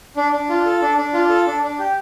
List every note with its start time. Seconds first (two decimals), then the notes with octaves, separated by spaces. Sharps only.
0.17 D4
0.33 D4
0.49 F4
0.66 A4
0.82 D4
0.97 D4
1.14 F4
1.29 A4
1.47 D4
1.63 D4
1.79 G4